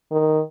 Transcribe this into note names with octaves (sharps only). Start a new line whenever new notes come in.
D#3